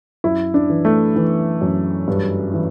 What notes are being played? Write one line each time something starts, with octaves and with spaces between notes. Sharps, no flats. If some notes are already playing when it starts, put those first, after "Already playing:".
F#2 E4
D4
E3
A3
E3
F#2
G2
E3